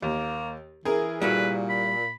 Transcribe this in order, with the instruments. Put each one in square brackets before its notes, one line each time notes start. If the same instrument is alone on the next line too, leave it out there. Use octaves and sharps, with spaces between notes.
[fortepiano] D#2 [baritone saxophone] A#3
[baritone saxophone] E3 [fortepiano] G#4 A#4
[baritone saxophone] A#2 [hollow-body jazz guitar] G3 E4 F#4 [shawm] B4
[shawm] B5